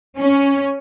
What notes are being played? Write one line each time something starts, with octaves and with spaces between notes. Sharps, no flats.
C#4